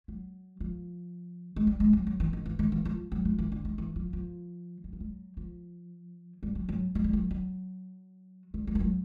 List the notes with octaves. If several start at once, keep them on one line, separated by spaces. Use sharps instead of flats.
F#3
F3
G#3
G3
G#3
F#3
F#3
E3
D#3
E3
D#3
E3
F3
F#3
F3
E3
D3
D#3
E3
F3
F3
F#3
F3
F#3
F3
G3
F#3
F#3
F#3
G3
F#3
F#3
G3
G3
F3
F#3